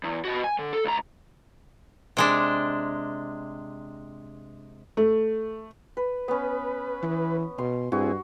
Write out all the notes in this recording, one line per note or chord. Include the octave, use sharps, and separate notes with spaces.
E2
B2 F#4
G#5
D3
A4
C#2 A#5
C3 G#3 D4
A3
B4
B3 C#4 B4
E3
B2 C6
G2 C4 E4 F#4 G#4